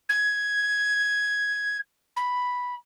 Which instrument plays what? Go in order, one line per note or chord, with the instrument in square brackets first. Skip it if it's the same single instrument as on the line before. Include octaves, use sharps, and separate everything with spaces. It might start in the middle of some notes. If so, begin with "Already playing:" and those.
[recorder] G#6
B5